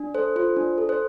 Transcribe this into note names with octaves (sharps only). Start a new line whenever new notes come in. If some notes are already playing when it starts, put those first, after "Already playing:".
Already playing: D4
A4 C5
F4 C5
D4
A4
C5